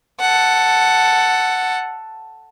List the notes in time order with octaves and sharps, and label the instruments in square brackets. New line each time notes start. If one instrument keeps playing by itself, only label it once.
[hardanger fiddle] A4 F#5